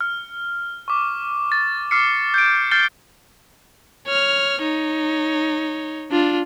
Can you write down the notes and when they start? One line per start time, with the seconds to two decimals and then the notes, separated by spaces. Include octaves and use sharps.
0.01 F6
0.88 C#6 D6
1.52 A6
1.91 D6 F6 C7 C#7
2.34 G6 D7
2.71 F6 G6 A6 C7 G7
4.07 C#5 F6
4.62 D#4 C#5
6.11 D4 F4